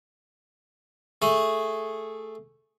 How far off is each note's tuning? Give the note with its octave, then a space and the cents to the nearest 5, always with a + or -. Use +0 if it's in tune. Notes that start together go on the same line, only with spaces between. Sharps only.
A3 +0 G#4 +5